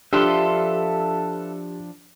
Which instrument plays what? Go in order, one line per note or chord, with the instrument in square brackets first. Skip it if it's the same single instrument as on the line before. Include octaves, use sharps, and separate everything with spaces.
[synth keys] F3 D4 [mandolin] F4 A4 B4 [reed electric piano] G4 [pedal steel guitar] E5 C6